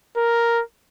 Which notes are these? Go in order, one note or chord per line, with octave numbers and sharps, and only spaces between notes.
A#4